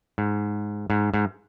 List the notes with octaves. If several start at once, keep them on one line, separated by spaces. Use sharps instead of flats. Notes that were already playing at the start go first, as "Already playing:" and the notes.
G#2
G#2
G#2